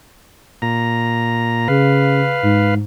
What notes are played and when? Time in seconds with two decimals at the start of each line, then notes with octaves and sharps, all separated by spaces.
0.62 A#2 A#5
1.68 C#3 B4 F5
2.43 G#2